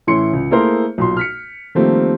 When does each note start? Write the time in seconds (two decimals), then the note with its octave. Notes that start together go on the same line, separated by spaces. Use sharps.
0.07 A2 E3 C#4 E4 C6 C#7
0.33 C#2
0.51 A3 A#3 E4 G#4 A#4 C5
0.98 B1 A#2 C6
1.17 F6 B6 C#7
1.75 D#3 F3 G3 A3 A#3 C4